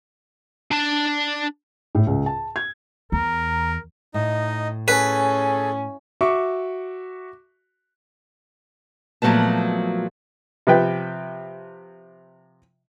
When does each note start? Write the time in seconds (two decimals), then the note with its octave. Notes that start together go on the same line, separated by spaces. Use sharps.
0.71 D4 A5
1.95 A2
2.07 C#2
2.26 A5
2.56 G#6
3.12 E2 A#4 A#5
4.14 A2 D#4 D#5
4.88 C#4 G#4 A4 B4
6.21 F#4 E5 C#6 D6
9.22 A#2 F3 F#3 A3 B3 A5
10.67 C3 F3 B4 G5